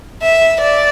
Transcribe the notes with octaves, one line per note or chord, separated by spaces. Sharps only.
E5
D5